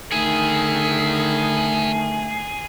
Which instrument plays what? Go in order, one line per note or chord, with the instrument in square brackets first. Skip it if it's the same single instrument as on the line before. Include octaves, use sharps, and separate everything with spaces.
[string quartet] D3 D#3 [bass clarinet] A3 [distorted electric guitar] B3 E4 [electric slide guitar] G#4